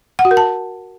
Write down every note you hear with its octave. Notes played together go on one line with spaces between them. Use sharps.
F#5
F#4
A#4
A5